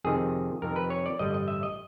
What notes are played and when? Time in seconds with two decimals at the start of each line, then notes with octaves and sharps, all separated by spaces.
0.04 F2 C3 D#3 G#4
0.62 F2 C3 D#3 A#4
0.76 B4
0.90 C#5
1.06 D5
1.19 A1 G2 D3 G3 D#5
1.34 D#5
1.48 E5
1.63 D#5